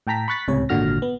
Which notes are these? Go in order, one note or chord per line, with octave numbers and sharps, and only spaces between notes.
A2 G5 A5 A#5 B6
B5 C#6 F#6 A6 B6
C#2 A2 C3 C#5
G#1 A#2 D3 F#4 F6 A#6
B3